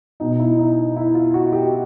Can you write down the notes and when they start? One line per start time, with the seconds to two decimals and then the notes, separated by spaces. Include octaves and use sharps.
0.20 B2 D#4
0.39 E4
0.58 D#4
0.96 E4
1.15 F4
1.34 F#4
1.52 G4